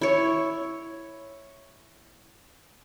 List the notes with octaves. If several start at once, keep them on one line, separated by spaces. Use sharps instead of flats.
E4 C#5